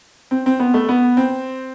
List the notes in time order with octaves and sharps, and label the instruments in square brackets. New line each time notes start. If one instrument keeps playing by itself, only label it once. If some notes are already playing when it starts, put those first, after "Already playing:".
[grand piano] C4
C4
B3
A3
B3
C4